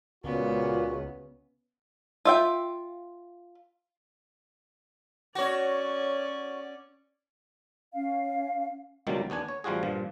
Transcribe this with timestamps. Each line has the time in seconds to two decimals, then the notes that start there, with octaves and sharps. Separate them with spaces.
0.24 C#2 A#2 C#3 B3 F#4
2.25 F4 E5 G5
5.35 C#4 F#4 C#5 D5
7.94 C#4 F5
9.07 C#2 B2 D#3 F#3 G3 A#3
9.30 D#2 B3 D4 G#5
9.48 C#5
9.64 A1 F3 G3 F4 F#4 G#4
9.83 G2 A#2 F3